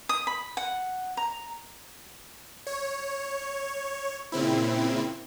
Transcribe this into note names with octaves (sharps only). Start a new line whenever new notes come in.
D#6
B5
F#5
A#5
C#5
A#2 C#3 C4 E4